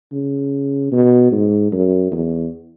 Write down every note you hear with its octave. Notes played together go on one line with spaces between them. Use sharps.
C#3
B2
G#2
F#2
E2